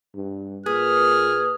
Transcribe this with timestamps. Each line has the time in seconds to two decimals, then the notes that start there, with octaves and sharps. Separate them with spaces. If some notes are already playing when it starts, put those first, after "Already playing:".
0.15 G2
0.66 A#2 G#4 B4 D#6 F6